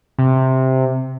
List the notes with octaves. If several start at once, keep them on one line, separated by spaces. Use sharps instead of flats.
C3